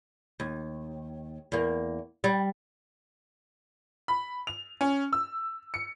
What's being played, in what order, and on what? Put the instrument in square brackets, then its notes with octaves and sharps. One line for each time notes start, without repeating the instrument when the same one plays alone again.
[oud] D#2
E2 A#3
G3
[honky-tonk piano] B5
F7
C#4
E6
C#7